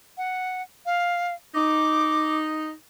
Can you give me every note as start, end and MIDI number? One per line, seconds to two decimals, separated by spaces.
0.17 0.62 78
0.86 1.34 77
1.55 2.69 63
1.55 2.38 86